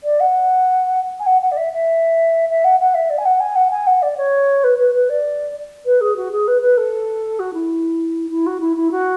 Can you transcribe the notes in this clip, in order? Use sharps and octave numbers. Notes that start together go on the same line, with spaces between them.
D5
F#5
G#5
F#5
F#5
D5
E5
E5
E5
F#5
F#5
E5
D5
G#5
F#5
G#5
F#5
G#5
F#5
D5
C#5
B4
B4
B4
D5
B4
G#4
F#4
G#4
B4
B4
A4
F#4
E4
E4
F#4
E4
E4
F#4